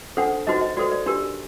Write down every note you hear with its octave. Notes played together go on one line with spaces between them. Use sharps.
D4 A4 C5 F#5
D#4 F#4 C5 D#5
D#5
F#4 A4 C5 D5
D5
D4 G4 A#4